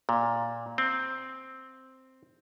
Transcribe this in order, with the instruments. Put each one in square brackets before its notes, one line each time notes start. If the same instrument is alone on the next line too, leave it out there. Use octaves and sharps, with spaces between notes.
[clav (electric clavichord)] A#2
C4